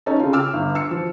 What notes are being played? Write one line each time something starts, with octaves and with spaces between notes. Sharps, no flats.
C#4 D#4 A4
C#3 F4
D6 E6 F6
G1
E6 C#7
F3